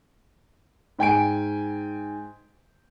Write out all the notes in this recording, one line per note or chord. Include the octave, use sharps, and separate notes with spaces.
G#2 G5 G#5 D7